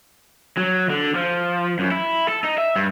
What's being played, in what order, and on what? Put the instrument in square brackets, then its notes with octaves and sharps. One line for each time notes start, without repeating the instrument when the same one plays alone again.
[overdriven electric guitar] F#3
D3
F3
F#2
E4
A4
D#4
E5
G2